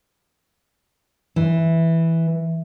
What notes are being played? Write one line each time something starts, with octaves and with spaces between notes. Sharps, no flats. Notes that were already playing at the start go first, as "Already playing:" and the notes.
E3